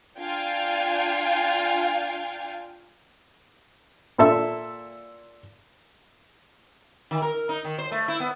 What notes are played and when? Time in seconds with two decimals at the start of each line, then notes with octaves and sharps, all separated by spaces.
0.18 D4 F4 F5 G5 G#5
4.18 A#2 A4 E5 E6
7.11 D#3
7.22 A#4
7.49 D#4
7.65 D#3
7.78 C5
7.91 A3
8.08 E4
8.20 B3